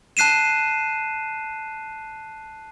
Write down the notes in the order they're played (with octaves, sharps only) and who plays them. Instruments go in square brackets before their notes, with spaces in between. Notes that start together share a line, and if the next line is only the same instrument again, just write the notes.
[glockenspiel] A5 F#6 C7 D#7 E7